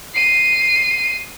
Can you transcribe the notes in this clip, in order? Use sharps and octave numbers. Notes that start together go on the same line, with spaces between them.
C7 D#7